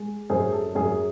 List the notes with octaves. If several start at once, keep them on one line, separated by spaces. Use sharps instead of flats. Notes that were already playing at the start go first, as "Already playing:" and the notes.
Already playing: G#3
F#2 G#4 C5
A4
F#2 G#4